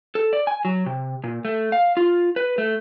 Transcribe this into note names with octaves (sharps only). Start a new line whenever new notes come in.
A4
D5
G#5
F#3
C3
A#2
A3
F5
F4
B4
A3